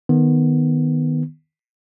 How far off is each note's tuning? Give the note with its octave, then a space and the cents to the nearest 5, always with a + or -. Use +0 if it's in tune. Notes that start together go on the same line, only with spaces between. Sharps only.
D#3 -5 B3 +0